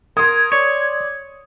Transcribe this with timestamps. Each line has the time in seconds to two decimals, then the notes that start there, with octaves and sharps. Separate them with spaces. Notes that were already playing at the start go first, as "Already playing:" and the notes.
0.17 A#4 C6 D#6 G#6
0.52 C#5 D5